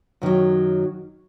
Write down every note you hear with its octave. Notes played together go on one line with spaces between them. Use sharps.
F#2 D#3 F#3